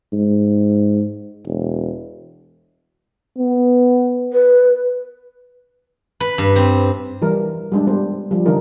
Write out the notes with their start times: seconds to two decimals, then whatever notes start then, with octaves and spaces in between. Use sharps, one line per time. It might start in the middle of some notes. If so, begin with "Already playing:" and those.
0.13 G#2
1.46 E1
3.38 B3
4.33 B4
6.20 B4
6.38 G2
6.56 C4
7.22 E3 G3 A#4
7.72 G3 G#3 D4
7.87 G3 B3 C5
8.31 F3 G3
8.46 D3 E3 G3 D4 D#4 A#4